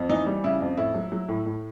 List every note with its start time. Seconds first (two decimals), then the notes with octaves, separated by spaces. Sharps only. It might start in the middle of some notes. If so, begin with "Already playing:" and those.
Already playing: F2
0.09 E3 D#4
0.27 G3
0.44 C#3 E4
0.61 F2
0.77 A2 E4
0.94 F#3
1.12 F#3
1.28 A2
1.46 A2